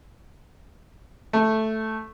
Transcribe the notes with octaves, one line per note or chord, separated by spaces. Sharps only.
A3